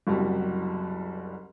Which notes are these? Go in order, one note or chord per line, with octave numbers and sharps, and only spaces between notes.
F#1 C2 F#3 G3